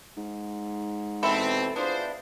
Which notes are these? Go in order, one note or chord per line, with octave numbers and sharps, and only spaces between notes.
G#2
B2 E3 C4 A4 E5 B5
B3 D4 E4 F4 G#4 C5